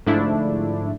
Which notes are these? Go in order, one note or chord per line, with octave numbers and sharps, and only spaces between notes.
G#2 D3 F3 A3 D4 E4